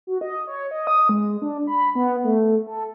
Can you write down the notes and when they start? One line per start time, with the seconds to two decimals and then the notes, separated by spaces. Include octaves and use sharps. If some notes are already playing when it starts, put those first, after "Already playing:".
0.07 F#4
0.21 D#5
0.47 C#5
0.71 D#5
0.87 D#6
1.09 G#3
1.42 D4
1.67 B5
1.95 B3
2.24 A3
2.67 A4